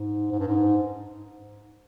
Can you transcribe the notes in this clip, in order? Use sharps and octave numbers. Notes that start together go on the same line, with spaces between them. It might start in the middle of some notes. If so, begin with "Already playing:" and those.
Already playing: G#2
G#2
G2
G#2